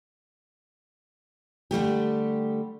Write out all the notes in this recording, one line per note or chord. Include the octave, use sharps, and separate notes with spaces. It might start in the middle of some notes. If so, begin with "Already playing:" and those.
D3 G3 A3 G4